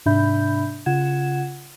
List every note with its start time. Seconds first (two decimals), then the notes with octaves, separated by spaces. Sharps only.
0.06 G#2 C3 D4 E5 B5 G6
0.86 C#3 F4 F#5 G#6 E7